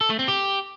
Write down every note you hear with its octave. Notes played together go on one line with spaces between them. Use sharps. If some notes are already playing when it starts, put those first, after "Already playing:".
A4
A3
C4
G4